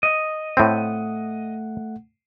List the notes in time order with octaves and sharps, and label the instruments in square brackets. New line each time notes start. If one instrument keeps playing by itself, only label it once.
[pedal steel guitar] D#5
[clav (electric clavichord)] A2 C4 [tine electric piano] A3 F#5